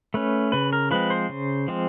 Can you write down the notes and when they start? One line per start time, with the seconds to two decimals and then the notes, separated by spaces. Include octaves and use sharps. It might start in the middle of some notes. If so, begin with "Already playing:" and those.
0.14 A3 C#4 B4
0.52 C#3 B4
0.73 A#4
0.91 F3 G#3 C4 B4
1.10 C5
1.29 C#3
1.68 F3 G#3 C4